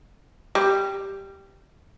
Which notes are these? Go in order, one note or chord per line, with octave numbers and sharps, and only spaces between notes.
G3